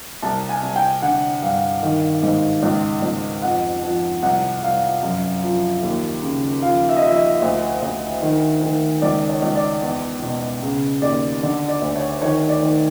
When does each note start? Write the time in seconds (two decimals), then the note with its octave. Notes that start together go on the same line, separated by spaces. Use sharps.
0.22 C2 A5
0.49 G#5
0.63 C2
0.76 G5
1.02 D3 F#5
1.42 G2 F5
1.83 D#3
2.23 G#2
2.63 C#2
3.02 C#2
3.42 F2 F#5
3.82 F3
4.22 C2 F#5
4.62 C2 F5
5.03 F#2
5.42 F3
5.82 D#2
6.23 C#3
6.62 F3 F5
6.89 E5
6.96 D#5
7.02 F3 E5
7.15 D#5
7.42 D2
7.82 D2
8.22 D#3
8.63 D#3
9.02 C#2 D5
9.28 C#5
9.42 C#2
9.56 D5
9.82 E2
10.22 B2
10.62 C#3
11.02 D#2 D5
11.42 D3 D5
11.68 D5
11.82 D2
11.96 C#5
12.22 D#3 C#5
12.49 D5
12.62 D#3